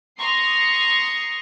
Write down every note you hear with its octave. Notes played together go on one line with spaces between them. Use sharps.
A#5 C6 C#6 D#6 C7